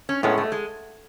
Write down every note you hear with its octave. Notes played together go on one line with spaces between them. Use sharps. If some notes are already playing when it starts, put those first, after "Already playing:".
C#4
A2 G#3 B3 C#4
A3
G#3